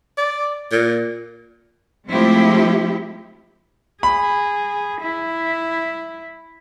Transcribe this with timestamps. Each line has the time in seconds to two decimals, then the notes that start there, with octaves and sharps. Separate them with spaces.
0.18 D5
0.72 A#2
2.08 F3 G#3 A3 C4 E4 G4
4.03 G#4 B5
5.01 E4